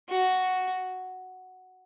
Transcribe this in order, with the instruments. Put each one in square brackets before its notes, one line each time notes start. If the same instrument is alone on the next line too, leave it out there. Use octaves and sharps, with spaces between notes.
[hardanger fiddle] F#4